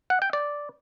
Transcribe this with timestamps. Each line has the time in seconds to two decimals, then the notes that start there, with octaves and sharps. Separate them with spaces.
0.10 F#5
0.22 G5
0.33 D5